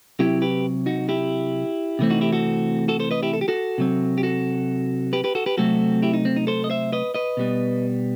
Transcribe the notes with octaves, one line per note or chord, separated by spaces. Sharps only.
C3 F#3 C4 E4 G4
G4 B4
D#4 F#4
E4 G4
C3 E3 A3 C4
D#4 F#4
E4 G4
F#4 A4
F#4 A4
A4 C5
B4 D#5
E4 G4
A4
G4
F#4 A4
C3 F#3 C4
G4
F#4 A4
G4 B4
G4 B4
F#4 A4
G4 B4
C3 F#3 A3 C4 F#4 A4
E4 G4
D#4
C4
D#4
A4 C5
D#5
C5 E5
B4 D#5
B4 D#5
B2 G3 B3